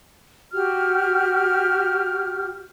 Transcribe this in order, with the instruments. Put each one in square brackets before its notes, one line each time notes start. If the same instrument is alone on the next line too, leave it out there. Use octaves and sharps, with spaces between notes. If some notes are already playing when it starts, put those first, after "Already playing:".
[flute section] F#4 G4 F6